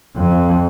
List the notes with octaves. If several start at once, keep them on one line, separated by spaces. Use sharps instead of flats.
F2